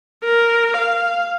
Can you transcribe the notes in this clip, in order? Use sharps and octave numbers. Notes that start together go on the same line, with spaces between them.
A#4
F5